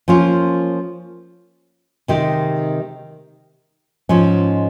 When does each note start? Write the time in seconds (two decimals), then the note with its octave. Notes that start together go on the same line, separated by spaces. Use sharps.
0.08 F3 A#3 C#4 F4
2.08 C3 D#3 G#3 D#4 G4
4.09 G#2 F3 G#3 C#4